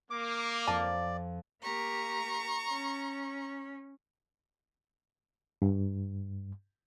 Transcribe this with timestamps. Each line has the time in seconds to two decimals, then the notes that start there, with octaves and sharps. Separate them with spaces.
0.11 A#3 D6
0.67 F2 D5 F5 A5 A#5
1.62 A#3 G4 A#5 C#6
2.68 C#4
5.62 G2